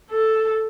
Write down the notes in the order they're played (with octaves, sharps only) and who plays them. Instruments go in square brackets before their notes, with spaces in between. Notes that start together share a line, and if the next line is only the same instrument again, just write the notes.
[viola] A4